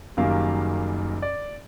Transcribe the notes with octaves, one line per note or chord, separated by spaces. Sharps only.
F#1 F#2 D#3 G3 A#3 F5
D5